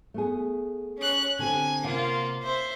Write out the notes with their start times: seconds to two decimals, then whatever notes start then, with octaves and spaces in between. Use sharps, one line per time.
0.14 A3 B3 G#4
0.98 C#4 F#6
1.39 D3 C4 G4 G#5
1.84 C3 A#3 F4 F5 F#5
2.43 C5 E5